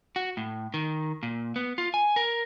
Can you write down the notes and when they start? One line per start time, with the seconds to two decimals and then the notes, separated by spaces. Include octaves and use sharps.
0.16 F#4
0.37 A2
0.74 D#3
1.23 A#2
1.56 B3
1.78 F4
1.94 G#5
2.16 A#4